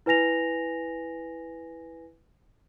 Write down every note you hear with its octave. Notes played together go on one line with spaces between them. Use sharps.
E4 B4 G#5 A#6 F7